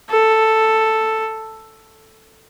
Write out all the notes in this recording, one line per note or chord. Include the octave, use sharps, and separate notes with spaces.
A4